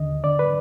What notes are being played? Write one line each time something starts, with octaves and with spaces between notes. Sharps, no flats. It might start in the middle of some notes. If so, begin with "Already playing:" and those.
Already playing: D#2 D3 D#5
D2
D3 D5
B4